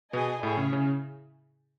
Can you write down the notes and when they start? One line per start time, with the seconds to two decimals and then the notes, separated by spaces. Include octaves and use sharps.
0.13 B2 B3 G#4 D#5 G#5
0.42 A2 A3 E4 G#4 C#5
0.57 C#3 C#4
0.72 C#3 C#4